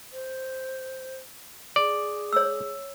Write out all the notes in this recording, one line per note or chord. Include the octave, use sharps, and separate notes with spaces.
C5
G#4 D5
C#5 E6